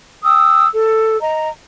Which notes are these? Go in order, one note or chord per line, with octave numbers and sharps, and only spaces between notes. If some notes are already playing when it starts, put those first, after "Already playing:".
G5 D#6 E6
A4
D#5 A#5